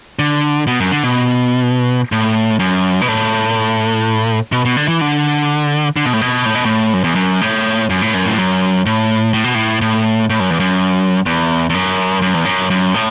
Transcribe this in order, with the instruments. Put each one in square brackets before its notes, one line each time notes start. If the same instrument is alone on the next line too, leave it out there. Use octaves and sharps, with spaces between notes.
[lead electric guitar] D3
B2
F#2
D3
B2
A2
F#2
B2
A2
B2
B2
D3
E3
D3
D3
B2
A2
B2
A2
B2
A2
F#2
E2
F#2
A2
F#2
A2
F#2
A2
F#2
A2
A2
B2
A2
A2
A2
F#2
E2
F#2
E2
E2
F#2
F#2
E2
F#2
F#2
A2